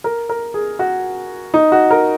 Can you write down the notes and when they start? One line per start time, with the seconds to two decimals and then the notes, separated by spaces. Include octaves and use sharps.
0.04 A#4
0.29 A#4
0.54 G#4
0.79 F#4
1.54 D#4
1.72 F#4
1.91 A#4